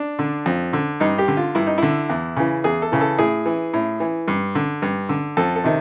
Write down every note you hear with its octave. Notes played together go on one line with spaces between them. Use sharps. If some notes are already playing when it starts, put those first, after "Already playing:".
Already playing: D4
D3
F2
D3
G2 D#4
G4
D3
F4
G2 E4
D#4
D3 E4
E2
C#3 E3
E2 G#4
A4
C#3 E3
A4
A2 G#4
E3
A2
E3
G2
D3
G2
D3
F2 A4
A4
C3 D#3